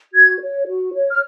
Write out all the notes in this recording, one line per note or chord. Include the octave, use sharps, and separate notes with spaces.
F#4 G#6
C#5
F#4
C#5
F6